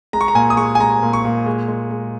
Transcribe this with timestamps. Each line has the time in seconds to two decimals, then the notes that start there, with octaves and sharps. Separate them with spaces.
0.13 G#3 A#5
0.21 C#6
0.28 A#5
0.35 A#2 G#5
0.50 D#6
0.57 G#3 C#6
0.75 G#5
0.80 G#3 A#5
1.03 A#2
1.13 C#6
1.25 A#2
1.46 G#3
1.68 G#3
1.91 G#3